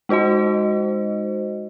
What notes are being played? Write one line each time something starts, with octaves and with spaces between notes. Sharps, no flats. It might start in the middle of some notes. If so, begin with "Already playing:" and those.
G#3 D#4 F#4 C5 D#5